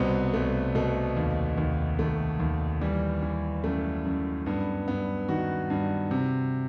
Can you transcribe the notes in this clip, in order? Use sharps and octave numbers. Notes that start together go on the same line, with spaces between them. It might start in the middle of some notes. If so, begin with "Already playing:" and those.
Already playing: C2 B2 B3 C4
C2 A3
B2 A3
D#2
D#2
D#2 A3
D#2
E3 G3
E3
F#2 A3
F#2
G2 B3
G2 B3
D#3 F#4
G2
C3